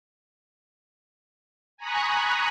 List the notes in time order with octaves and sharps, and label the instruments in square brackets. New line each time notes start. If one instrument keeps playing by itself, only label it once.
[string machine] G#5 A#5 B5 C#6 D#6 F#6